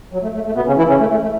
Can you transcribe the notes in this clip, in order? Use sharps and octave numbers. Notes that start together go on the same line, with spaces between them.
F#3
A3
A3
A3
B2 B3
C#3 C#4
E3 E4
C#3 C#4
A3
A3
A3